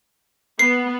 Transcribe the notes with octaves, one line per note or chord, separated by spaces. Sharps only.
B3 C7